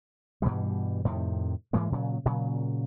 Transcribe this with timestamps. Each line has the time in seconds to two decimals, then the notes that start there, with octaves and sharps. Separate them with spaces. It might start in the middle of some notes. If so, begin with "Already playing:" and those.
0.42 G2 B2 E3 G3
1.05 F2 A2 C3 D#3
1.73 G#2 E3 G#3 A#3
1.92 A#2 C#3 F#3
2.25 A#2 C#3 F#3